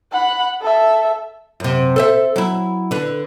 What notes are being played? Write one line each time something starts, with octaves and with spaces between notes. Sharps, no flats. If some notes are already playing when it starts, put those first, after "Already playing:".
F#5 B5
A4 E5
F#2 C3
A4 C5 E5
F#3 E4
D3 B4